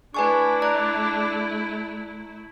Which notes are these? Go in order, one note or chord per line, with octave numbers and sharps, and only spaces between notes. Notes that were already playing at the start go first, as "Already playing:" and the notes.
A3 D4 E4 B4 G#5 C#6
D5 A#5 F#6